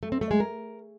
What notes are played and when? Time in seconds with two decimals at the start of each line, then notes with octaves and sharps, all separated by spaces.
0.03 A3
0.12 C4
0.21 A3
0.31 G#3
0.40 A#4